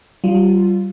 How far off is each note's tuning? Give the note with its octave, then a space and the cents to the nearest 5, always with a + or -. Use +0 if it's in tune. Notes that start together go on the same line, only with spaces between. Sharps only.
G3 -30 F4 +0